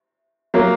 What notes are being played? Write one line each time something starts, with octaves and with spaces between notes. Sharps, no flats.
F#3 A#3